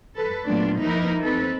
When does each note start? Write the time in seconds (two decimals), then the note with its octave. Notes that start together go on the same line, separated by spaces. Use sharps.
0.17 A4 B4
0.46 A#2 F#3 A3 B3 D4 F4
0.81 F3 A#3 D#4 E4 A#4 B4
1.21 C4 D#4 A4 B4